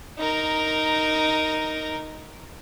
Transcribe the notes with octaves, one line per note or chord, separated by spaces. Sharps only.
D#4 A#4